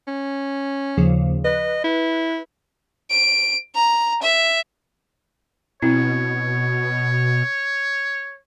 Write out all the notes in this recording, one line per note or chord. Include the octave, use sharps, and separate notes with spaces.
C#4
D#2 C#3 F3
B4 D#5
E4
D7
A#5
E5
B2 C4 E4 C#5